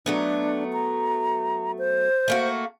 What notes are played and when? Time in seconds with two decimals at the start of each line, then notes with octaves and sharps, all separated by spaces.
0.06 F#3 A3 B3 D4
0.73 A#5
1.78 C5
2.28 A3 A#3 F#4